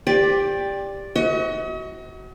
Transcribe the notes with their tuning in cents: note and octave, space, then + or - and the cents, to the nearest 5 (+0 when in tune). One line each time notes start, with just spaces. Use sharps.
G4 +15 D5 +0 C6 +35
F#4 +20 D#5 +45